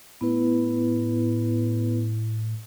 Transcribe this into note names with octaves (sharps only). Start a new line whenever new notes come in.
A2 B3 E4 B4